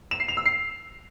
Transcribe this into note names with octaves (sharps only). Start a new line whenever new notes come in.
E7
C7
F7
E6
C7